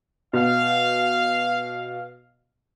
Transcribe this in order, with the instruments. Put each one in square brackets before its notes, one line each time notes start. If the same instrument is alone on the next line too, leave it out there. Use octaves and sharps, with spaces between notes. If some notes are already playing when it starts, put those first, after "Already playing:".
[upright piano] B2 [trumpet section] F5